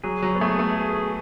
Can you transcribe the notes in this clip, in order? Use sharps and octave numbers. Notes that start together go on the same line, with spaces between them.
F#3 G#4
F#3
B3
A3 G#4
A3
G#4